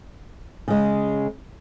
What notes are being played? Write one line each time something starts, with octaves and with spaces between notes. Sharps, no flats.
C#3 G#3